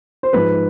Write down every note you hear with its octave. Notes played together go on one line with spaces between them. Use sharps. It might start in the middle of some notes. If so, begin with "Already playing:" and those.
C5
G#2 F3 B4